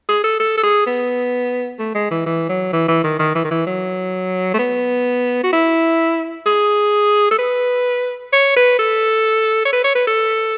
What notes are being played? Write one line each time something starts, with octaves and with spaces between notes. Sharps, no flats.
G#4
A4
A4
A4
G#4
B3
A3
G#3
E3
E3
F#3
E3
E3
D#3
D#3
E3
D#3
E3
F#3
A3
B3
F#4
E4
G#4
A4
B4
C#5
B4
A4
C#5
B4
C#5
B4
A4